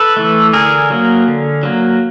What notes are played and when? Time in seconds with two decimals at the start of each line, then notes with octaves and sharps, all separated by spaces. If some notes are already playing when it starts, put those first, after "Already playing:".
Already playing: A4 B4
0.17 E3 A3
0.53 D3 G#4 A#4
0.90 F#3 A#3
1.27 D3
1.63 F#3 A#3